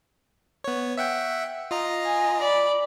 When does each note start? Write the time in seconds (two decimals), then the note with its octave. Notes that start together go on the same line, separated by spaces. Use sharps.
0.64 B3 C#5
0.98 E5 F#5 G5
1.71 F4 D#5 A#5
2.04 G#5
2.40 D5 B5